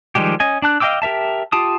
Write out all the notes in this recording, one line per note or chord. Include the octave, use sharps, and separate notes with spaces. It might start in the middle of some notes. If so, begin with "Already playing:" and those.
D#3 F3 G3 G#3 G4
C#4 D#5 G#5
D4 A5 F#6
D#5 F5 G5 D6 E6
G4 A#4 E5 A5
F4 G4 A5 D#6